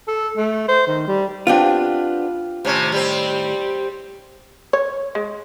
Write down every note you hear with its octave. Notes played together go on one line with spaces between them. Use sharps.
A4
A3
C5
D#3
G3
B3 C4 D4 F4 G4
A2 C3 D#3 C#4
G3 C4
C#5
G#3